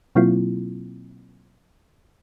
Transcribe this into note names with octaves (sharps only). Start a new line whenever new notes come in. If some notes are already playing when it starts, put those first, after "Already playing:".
B2 F#3 A#3 C4 E4 F4